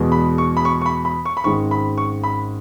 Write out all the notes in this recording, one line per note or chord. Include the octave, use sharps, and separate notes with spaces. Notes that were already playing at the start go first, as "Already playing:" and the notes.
Already playing: E2 B2 G#3 B3
B5
C#6
B5
C#6
C#6
B5
B5
C#6
B5
G#1 G#2 D#3 G#3 C#4 C#6
B5
C#6
B5